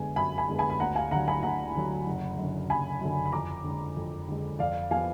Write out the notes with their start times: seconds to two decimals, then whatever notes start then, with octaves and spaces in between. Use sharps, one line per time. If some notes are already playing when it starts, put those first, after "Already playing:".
Already playing: F#2 D3 G#3 B3 G#5
0.16 F#2 G#5 B5
0.38 G#5 B5
0.49 D3 G#3 B3
0.59 G#5 B5
0.70 B5
0.80 D2 F#5 A#5
0.96 F5 G#5
1.11 D3 F#3 F#5 A#5
1.28 G#5 B5
1.43 D2 F#5 A#5
1.75 D3 F#3
2.06 F#1
2.38 F#2 D3
2.70 F#1 G#5 B5
3.01 F#2 D3
3.26 B5
3.32 F2 A#5 D6
3.64 D3 G#3
3.97 F2
4.28 D3 G#3
4.59 F2 D5 F5
4.91 F3 B3 F5 G#5